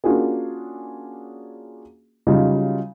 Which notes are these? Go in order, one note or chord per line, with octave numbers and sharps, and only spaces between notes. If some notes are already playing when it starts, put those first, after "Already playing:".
A#3 C#4 D4 F4 F#4 G#4
C#3 F#3 G3 D#4 F4